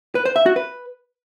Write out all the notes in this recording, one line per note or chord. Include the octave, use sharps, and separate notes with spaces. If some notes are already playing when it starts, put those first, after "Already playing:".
B4
C5
E5
F#4
B4